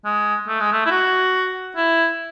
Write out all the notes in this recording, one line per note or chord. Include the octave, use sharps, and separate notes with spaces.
G#3
A3
G#3
A3
E4
F#4
E4